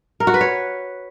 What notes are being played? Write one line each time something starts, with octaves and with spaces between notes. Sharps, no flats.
A#4
F#4
B4
C#5